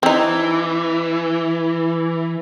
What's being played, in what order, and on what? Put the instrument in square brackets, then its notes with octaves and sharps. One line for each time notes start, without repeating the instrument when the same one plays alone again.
[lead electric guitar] E3 [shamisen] C4 D#4